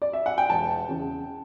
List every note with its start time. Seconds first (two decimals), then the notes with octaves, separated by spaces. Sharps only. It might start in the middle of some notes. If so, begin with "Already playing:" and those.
0.02 D5
0.13 E5
0.26 F#5
0.38 G5
0.50 E1 A5
0.89 E2 C#3